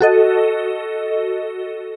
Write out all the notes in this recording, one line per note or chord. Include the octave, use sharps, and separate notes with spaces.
F#4 A4 D#5